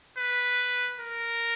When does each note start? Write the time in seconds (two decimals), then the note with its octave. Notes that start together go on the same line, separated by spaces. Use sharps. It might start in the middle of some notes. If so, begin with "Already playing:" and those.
0.17 B4
1.00 A#4